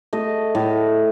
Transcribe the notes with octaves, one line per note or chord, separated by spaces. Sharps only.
A3 D#5
A2